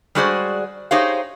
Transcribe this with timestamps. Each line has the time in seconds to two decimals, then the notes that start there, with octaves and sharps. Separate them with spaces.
0.15 G3 G#3 F#4 G#4 C5 D5
0.91 D#4 G4 G#4 C5 C#5 F5